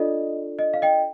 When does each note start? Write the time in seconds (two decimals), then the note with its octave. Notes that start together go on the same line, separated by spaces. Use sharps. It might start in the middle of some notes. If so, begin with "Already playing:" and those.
Already playing: D4 F4 A4 D5 D#5
0.59 D#5
0.74 F5
0.82 D#5 G5